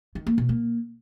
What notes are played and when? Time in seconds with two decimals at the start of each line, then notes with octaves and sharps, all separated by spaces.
0.15 D#3
0.27 A#3
0.38 B2
0.49 A#3